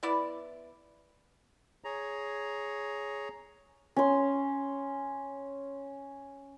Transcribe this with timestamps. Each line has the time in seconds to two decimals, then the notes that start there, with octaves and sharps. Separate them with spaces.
0.03 B3 E4 D5
1.84 G#4 C#5 A#5
3.96 C#4 C6